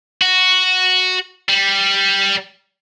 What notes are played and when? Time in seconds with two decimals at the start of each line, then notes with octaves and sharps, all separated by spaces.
0.21 F#4
1.49 G3